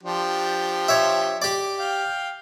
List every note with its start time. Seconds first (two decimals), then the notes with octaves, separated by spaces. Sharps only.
0.03 F3 D4 G4
0.88 C#5 E5
1.42 G4 D5
1.79 F5 G5